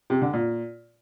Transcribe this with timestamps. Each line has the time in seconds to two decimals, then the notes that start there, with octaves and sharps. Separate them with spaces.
0.10 C3
0.22 D3
0.33 A#2